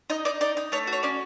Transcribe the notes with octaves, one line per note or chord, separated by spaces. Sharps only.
D#4 D#5
D#4 D5
D#4 D5
D#4
A3 C#5
F#4
C#5
C#4 D5